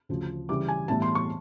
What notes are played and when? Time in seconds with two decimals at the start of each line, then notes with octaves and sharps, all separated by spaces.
0.09 D2 C#3 F3
0.49 C#3 E3 G3 D6
0.68 G#5
0.88 A2 E3 G3 B3 A5
1.02 C6
1.15 C#6